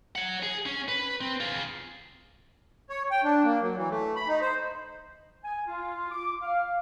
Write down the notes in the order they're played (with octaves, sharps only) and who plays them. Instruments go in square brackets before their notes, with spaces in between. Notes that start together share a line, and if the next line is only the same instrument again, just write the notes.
[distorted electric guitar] C#5 F#5
G#4
C#4
B4
C4
F4 G#4
[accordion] C#5
G5
D4
A#3
F#3
E3
A3
B5
D#4
C5
[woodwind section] G#5
F4
D6
F5